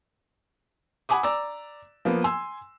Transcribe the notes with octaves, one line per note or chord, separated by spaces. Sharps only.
F#5 G#5 B5 D6 D#6
D5 A#5 D6 E6
F3 A#3 B3
G#5 C6 E6